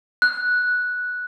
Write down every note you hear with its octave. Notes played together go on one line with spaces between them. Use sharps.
F#6